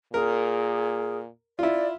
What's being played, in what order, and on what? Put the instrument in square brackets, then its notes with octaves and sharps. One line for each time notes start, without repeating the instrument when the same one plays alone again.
[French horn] A#2 [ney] G#4 [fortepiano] A#4
[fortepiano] E4 F4 [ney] D5